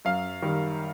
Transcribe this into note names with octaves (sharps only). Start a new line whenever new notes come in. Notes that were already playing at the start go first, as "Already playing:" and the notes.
F#2 F5
D#3 G3